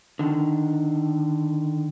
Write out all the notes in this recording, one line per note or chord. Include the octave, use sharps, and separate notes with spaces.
D3 D#3